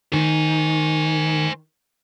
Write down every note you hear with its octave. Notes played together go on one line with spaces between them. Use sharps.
D#3 C5 G#5